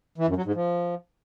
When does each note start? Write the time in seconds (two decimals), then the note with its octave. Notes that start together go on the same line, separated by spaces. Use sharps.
0.18 E3
0.27 F#2
0.36 F#3
0.46 G#2
0.55 F3